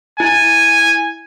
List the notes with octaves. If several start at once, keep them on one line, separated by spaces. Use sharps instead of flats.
E4 G#5